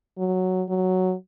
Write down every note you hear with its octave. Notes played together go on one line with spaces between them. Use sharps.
F#3
F#3